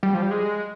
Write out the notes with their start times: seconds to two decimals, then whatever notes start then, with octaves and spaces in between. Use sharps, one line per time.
0.03 G3
0.14 F3
0.22 G3
0.31 G#3